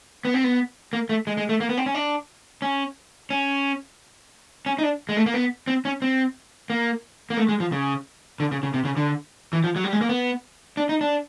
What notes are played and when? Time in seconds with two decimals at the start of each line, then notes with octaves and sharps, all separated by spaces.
0.25 B3
0.34 C4
0.44 B3
0.93 A#3
1.09 A3
1.27 G#3
1.37 G#3
1.49 A3
1.60 A#3
1.69 B3
1.77 C4
1.86 C#4
1.95 D4
2.62 C#4
3.30 C#4
4.66 C#4
4.79 D#4
4.83 D4
5.09 G#3
5.17 A3
5.26 A#3
5.34 B3
5.67 C4
5.85 C#4
6.02 C4
6.70 A#3
7.30 A#3
7.37 A3
7.49 G#3
7.60 F3
7.72 C#3
8.40 D3
8.51 C#3
8.63 C#3
8.74 C3
8.85 C#3
8.97 D3
9.53 E3
9.64 F3
9.76 F#3
9.84 G3
9.93 G#3
10.01 A#3
10.09 B3
10.77 D4
10.89 D#4
11.01 D4